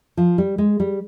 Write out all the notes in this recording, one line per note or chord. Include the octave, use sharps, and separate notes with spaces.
F3
G3
G#3
G3